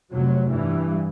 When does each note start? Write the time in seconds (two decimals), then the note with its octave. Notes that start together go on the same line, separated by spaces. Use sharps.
0.12 F1 C3 F#3
0.48 G2 E3